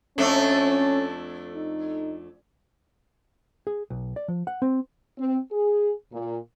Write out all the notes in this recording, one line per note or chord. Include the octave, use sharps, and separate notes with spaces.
F2 A3 C#4 D4
D#4
G#4
B1
D5
F3
F#5
C4
C4
G#4
A#2